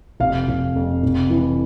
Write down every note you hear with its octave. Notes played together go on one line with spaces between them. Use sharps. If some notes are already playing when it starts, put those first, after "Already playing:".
F1 F5
F1
F2
F1
E3